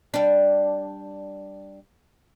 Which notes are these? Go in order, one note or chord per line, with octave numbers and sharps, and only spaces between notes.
G3 D4